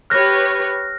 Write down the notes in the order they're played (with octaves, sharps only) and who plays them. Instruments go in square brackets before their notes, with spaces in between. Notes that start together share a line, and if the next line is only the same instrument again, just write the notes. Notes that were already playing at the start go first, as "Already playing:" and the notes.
[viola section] G4 B4 C#5 [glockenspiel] F6 F#6 A#6